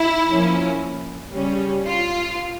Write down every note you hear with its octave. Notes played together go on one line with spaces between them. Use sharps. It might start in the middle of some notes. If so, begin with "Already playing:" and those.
Already playing: E4
F3 A#3 C#4
C#3 G3 C#4
F4